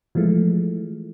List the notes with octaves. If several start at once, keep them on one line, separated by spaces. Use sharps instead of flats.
E3 F3 G#3 A3